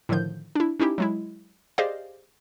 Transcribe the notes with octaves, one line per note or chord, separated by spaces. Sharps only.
A2 D3 D#3 F3 G6
D4 E4
C#4 D#4 E4 G4
F#3 G#3 E4
G4 G#4 C5 D5 D#5 F5